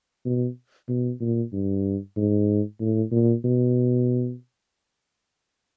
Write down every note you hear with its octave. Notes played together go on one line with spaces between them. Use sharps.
B2
B2
A#2
G2
G#2
A2
A#2
B2